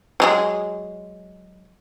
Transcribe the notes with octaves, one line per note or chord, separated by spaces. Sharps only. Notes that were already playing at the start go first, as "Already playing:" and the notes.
F#3 G#3 G#4